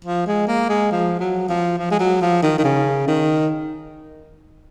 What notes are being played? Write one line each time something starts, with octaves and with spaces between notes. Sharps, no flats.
F3
G#3
A#3
G#3
F3
F#3
F3
F3
G#3
F#3
F3
D#3
D#3
C#3
D#3